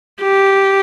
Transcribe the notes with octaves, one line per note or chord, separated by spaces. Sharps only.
G4